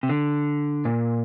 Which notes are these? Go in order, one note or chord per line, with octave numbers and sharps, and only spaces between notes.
C3
D3
A#2